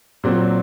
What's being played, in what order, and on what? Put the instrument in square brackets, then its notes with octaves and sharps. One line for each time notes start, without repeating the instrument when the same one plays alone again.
[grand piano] A#2 F#3 C4